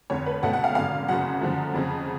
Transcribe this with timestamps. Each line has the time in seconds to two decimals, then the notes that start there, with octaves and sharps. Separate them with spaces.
0.10 F1 F2 D3 C#5
0.26 B4
0.42 C#2 B2 A3 F#5
0.53 F#5
0.64 F5
0.75 G#1 F#2 D3 F5
1.08 F#1 F#2 C#3 F#3 F#5
1.41 F#2 D3 F3 A3
1.74 F2 C#3 F3